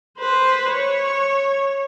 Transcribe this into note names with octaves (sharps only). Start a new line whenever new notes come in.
B4 C5
C#5